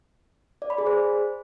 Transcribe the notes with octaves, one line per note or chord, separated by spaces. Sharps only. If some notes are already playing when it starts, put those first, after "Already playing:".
D5
B5
G#4
C5